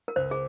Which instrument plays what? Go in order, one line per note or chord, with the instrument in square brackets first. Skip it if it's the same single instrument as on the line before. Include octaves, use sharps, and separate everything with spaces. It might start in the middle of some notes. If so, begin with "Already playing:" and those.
[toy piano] A#4
[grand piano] C#2 [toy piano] C5
[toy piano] G#4